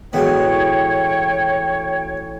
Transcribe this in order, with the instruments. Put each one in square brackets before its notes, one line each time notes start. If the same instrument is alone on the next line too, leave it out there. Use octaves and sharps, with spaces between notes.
[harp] A1 [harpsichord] B2 G#3 B3 [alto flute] C#5 [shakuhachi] G5